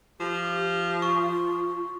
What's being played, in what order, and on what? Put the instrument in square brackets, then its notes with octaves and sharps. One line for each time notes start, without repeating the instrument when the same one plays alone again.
[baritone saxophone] F3 [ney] G4
[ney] F4 [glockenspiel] C#6